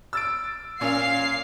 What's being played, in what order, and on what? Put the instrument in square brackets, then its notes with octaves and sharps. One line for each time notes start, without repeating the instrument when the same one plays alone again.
[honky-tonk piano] E6 A6 D7
[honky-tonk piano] A#2 C#4 [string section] F5 C7